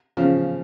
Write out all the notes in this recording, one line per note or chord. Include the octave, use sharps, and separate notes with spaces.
C#3 F3